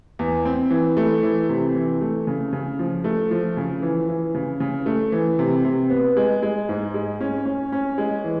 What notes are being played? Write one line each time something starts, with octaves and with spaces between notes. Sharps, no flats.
E2
C4
E3
A3
E3
C3
E3
A3
C#3
C#3
F3
A3
F3
C#3
E3
E3
C#3
C#3
A3
E3
C3
C3
B3
G#3
G#3
G#2
G#3
C#4
C#4
C#4
G#3
E3